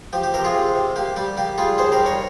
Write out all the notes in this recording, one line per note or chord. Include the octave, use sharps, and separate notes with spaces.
F3 G4
G4
C3 G4 A#4
F4 G#4
C3
C3
A#3 G4
G3 G4
A#3 G4
G3 F4 G#4
D#2 G#4 C5
G4 A#4
G3
A#4 C#5